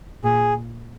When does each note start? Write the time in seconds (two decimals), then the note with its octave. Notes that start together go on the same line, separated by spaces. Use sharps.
0.23 A#2 G#4